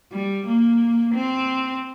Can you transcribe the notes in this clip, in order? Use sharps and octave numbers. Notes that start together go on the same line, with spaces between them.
G3
A#3
C4